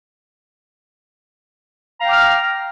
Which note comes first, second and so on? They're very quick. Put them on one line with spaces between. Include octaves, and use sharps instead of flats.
A#5 F5 G5 D6 F6